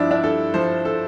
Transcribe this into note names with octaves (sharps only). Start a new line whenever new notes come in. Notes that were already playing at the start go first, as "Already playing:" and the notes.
Already playing: G2 F3 D4 E4
D4
G2 A4
F3 C5
A4